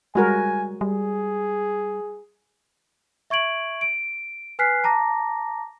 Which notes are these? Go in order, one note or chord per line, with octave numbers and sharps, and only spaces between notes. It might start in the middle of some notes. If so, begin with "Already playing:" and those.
G3 G#3 F#4 A#4 G#5
G3 G#4
E5 C#6 G#6 D7 F#7
D7
B4 G#5 F6 F#6 B6 C7
A5 A#5 D6 A#6